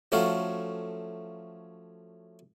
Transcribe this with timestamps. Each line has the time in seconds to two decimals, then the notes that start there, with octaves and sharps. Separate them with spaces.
0.12 F3 F#3 A3 C#4 A4 F5